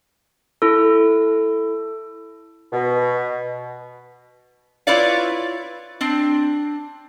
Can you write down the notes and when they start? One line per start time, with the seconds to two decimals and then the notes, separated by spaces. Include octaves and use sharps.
0.62 E4 A4
2.72 B2
4.87 E4 F4 B4 C#5 D5 F5
6.01 C4 D4